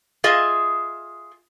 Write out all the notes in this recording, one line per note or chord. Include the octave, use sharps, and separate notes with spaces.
F4 G#4 D#5 E5